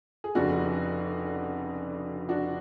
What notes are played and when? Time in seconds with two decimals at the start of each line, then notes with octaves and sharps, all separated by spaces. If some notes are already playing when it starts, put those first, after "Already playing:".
0.24 G#4
0.35 F1 F2 C#3 D4 F#4
2.29 D4 F#4